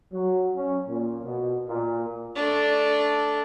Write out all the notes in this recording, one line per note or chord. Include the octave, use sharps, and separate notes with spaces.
F#3
C#4
A#2
B2
A#2
A3 D4